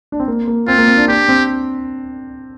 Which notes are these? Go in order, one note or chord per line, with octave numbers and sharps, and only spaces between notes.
D4
C4
A#3
A#3
C4 F4
A#3
C4
D4
D4 G4
C4